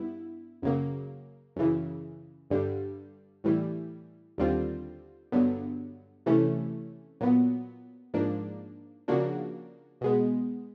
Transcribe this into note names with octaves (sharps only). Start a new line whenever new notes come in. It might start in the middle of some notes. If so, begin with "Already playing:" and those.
Already playing: G2 B3 E4
F#2 C#3 F#3 A#3
F#2 C#3 E3
G2 D3 G3
A2 E3 G3
D#2 D3 G3 C4 F4
G2 D3 F#3 B3
C3 E3 A3 C#4
A#2 F#3 B3
G#2 F3 A#3 D4
C#3 F3 A#3 D4 F#4
B2 G#3 B3